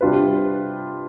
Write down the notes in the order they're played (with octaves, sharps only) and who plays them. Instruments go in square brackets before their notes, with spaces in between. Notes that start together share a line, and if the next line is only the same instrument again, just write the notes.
[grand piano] C3 G3 D4 F4 B4